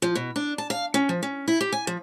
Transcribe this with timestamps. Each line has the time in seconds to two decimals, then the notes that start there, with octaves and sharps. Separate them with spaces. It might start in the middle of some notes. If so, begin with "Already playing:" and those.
0.02 F3
0.15 B2
0.36 D4
0.58 A5
0.70 F5
0.94 C#4
1.09 F3
1.23 C#4
1.48 E4
1.61 G4
1.72 G#5
1.87 F3